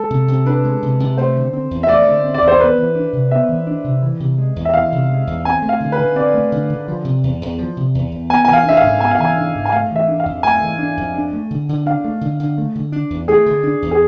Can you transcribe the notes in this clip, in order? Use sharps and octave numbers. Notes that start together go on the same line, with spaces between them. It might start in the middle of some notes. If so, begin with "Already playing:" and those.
Already playing: G#3 A4
C3
C3
D4 B4
G#3
C3
C3
A3 C5
D3
C4
E2
E5
A3 D5
D3
C4
D5
E2
C5
B3 B4
E3
D4
C3
B3 E5
E3
D4
C3
E3
C3
G#3
E2
E5
E3 F5
C3
G#3
E2
C4 G#5
A3
F5
D3
B4
D3
C4 D5
A3
D3
D3
F3
C3
E2
E2
F3
C3
E2
E2
B3 G#5
E3 G#5
F5
D4 E5
F5
G#2
B3 G#5
F5
E3 G#5
D4
G#2
G#5
A3 F5
E3 E5
D4
F5
F2
A3 G#5
E3
D4
F2
D4
A3
D3
D3
D4 F5
A3
D3
D3
A3
D3
D4
E2
A3 G#4
D3
D4
E2
G#4